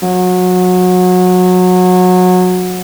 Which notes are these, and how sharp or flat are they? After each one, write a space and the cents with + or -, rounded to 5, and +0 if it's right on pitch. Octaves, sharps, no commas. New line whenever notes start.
F#3 -25